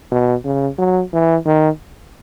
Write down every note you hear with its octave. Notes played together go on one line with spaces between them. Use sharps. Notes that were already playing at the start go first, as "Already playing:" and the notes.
B2
C#3
F#3
E3
D#3